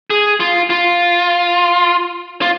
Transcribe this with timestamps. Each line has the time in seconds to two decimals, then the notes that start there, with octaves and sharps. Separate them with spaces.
0.10 G#4
0.40 F4
0.70 F4
2.42 F4